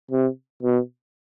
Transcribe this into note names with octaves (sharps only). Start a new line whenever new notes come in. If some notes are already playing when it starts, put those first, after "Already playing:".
C3
B2